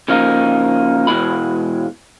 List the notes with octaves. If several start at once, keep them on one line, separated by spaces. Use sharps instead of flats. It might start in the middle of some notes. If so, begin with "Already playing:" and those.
C#3 F3 A#3 D#4
B2 E3 G#3 B5